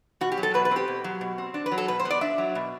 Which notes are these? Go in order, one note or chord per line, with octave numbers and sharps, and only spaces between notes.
B2 F#4
G4
F#3
A4
B2 B4
B4
C4 G4
B2
F#3
B2
C4
D4
B4
F#3
A4
B2 B4
C5
B3
D5
D4 E5
F#3
B2